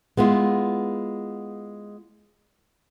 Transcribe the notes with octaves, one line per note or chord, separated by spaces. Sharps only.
G#3 B3 E4 F4